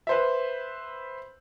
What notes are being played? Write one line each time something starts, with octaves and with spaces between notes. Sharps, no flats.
B4 C5 E5